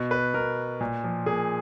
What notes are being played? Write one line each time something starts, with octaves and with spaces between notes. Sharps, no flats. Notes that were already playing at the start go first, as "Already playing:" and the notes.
Already playing: B2
B4
B2 A#4
A#2
F3
A#2 G#4